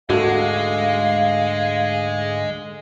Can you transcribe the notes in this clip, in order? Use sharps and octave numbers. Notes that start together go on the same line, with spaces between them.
D2 G#2 D3 G#3 F#4 A4 F5